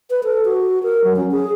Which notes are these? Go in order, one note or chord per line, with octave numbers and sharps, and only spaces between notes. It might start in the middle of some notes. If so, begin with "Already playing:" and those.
B4
A4
F#4
A#4
F#3
C#4
G#4